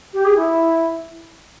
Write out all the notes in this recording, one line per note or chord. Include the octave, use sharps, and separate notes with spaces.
G4
G#4
E4